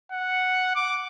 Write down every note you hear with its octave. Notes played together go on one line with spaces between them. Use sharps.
F#5
D6